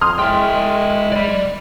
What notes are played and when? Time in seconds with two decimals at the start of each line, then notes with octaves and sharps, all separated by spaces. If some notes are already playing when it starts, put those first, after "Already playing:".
0.01 F2 C6 D#6 F6
0.19 G#3 E4 G5
0.56 G#3
1.12 D5 B5